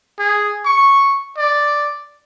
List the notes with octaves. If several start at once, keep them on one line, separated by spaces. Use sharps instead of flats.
G#4
C#6
D5